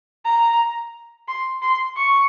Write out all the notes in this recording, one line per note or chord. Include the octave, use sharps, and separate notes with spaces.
A#5
C6
C6
C#6